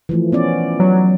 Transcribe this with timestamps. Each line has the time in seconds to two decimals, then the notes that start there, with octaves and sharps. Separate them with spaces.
0.09 E3 F3 A3
0.32 B3 C#4 D5
0.80 F#3